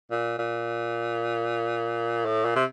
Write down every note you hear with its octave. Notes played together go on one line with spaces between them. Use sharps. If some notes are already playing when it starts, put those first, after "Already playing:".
A#2
A#2
A2
A#2
C3